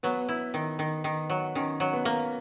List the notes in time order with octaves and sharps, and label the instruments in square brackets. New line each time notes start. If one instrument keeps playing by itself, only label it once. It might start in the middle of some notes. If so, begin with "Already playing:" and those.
[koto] F#3 [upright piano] B3
[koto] E4
D#3
D#3
D#3
F#3
[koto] D#3 [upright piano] C#4
[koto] F#3
[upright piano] B3
[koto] A#3